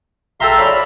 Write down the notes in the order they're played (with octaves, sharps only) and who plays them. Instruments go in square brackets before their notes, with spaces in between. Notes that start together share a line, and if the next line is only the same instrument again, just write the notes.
[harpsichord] A4 G5 C6 [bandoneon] E5 F5 A#5
[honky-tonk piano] C#5 D5 B5 [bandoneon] F6